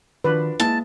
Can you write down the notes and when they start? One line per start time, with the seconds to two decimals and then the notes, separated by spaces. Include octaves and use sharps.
0.24 D#3 F3 D4 F#4 B4
0.60 G#3 A#3 E4 A5